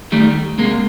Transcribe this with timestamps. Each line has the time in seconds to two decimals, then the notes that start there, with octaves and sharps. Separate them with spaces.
0.12 D#3 G3 A3
0.58 C3 G#3 A#3